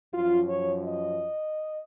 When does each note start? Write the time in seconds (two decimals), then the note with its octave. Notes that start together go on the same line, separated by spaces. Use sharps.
0.14 F#2 F3 F4
0.49 C#5
0.84 D#5